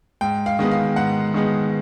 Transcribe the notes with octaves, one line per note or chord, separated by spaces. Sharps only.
G#2 G5
F5
D#3 G#3 B3
F5
G#2 F#5
D#3 G#3 B3